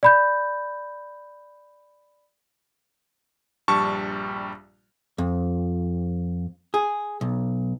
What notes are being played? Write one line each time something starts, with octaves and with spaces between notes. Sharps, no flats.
D5 B5 G6
A#1 G2 G3 A5 C#6
F2
G#4
B1